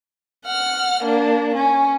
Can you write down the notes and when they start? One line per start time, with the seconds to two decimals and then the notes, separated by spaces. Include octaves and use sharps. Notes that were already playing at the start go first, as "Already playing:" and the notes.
0.45 F#5 F6
1.04 A#3 D4
1.55 C#4